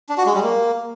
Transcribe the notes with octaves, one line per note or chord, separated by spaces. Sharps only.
D4
F#4
G#3
G3
A#3